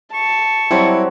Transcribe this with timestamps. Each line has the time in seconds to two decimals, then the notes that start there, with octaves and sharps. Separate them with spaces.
0.14 A5 C#6
0.71 F#3 G3 C4 E4